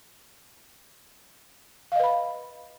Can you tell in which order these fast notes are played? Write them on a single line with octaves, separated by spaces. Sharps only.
F5 D#5 B4 B5